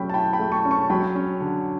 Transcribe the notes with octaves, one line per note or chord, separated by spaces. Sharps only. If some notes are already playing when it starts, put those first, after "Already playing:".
Already playing: F#3 A3 C#4 G5 B5
A5
E4 G5 B5
G5 B5
A3
A5 C#6
C#4
A5 C#6
F#3 G5 B5
C#4
D3